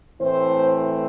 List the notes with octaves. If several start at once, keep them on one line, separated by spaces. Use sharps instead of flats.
A2 E3 A3 C4 C5